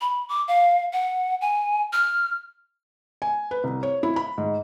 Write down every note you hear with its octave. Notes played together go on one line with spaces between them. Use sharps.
B5
D6
F5
F#5
G#5
F6
G#5
B4
C2
C#5
E4
B5
G#2